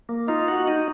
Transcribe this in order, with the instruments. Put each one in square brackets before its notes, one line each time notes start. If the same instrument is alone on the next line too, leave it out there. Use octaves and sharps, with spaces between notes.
[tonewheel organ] A#3
[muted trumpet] D#4 [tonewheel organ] F4
[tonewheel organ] F#4
D#4